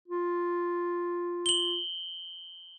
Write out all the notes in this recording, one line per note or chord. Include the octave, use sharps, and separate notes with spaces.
F4
F#7 G7